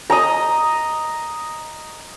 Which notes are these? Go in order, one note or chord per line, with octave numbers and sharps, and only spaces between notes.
D#5 A#5